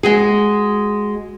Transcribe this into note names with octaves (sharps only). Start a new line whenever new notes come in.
G#3 F#4 G#4